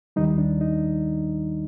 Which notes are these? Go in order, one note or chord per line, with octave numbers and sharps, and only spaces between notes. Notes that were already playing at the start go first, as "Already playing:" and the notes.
D#2 D#3 G3 D#4
D4
D#4